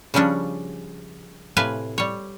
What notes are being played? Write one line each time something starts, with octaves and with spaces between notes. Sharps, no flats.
C#3 F3 G3 C#4 D4
A2 C3 B4 F5 G#5
G3 C#5